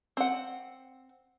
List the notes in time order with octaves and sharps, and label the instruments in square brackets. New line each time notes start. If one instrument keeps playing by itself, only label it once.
[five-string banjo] C4 F#5